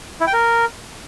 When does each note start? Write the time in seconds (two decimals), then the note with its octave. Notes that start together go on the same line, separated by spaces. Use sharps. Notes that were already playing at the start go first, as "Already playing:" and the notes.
0.21 E4
0.27 G5
0.33 A#4